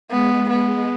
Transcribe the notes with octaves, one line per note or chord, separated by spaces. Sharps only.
G#3 B3
B3